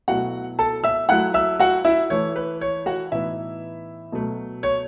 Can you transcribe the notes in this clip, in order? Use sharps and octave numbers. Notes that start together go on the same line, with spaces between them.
B2 F#3 A3 E4 F#4 F#5
A4 A5
E5 E6
F#3 A3 E4 F#5 F#6
E5 E6
F#4 F#5
E4 E5
E3 A3 E4 C#5
B4
C#5
F#4 F#5
A2 E3 B3 D#4 E4 E5
B2 F#3 A3
C#5